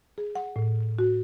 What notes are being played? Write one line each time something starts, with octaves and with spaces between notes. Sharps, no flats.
G#4
F#5
A2
F#4